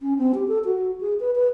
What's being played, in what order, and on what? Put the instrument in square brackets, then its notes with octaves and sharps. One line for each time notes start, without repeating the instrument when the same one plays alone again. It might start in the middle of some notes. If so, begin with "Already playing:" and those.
[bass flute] C#4
C4
G4
A4
F#4
G#4
B4
B4